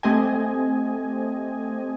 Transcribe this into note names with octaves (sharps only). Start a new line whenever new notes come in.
A3 C4 G4 D#5 G#5